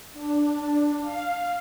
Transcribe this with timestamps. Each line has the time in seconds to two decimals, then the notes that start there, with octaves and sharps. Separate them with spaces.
0.13 D4
1.01 F5